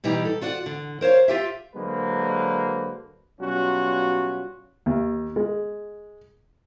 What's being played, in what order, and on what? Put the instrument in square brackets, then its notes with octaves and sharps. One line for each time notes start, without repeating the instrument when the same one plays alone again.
[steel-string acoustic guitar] B2 E3 G3 D#4 G4
A4
F4 F#4 D5 F#5
D3
A#4 C5 C#5 F5
F4 G4 E5
[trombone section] D3 F#3 G#3 A#3 B4 C5
B2 F#3 G3 C#4 F4 F#4
[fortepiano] D#2
G#3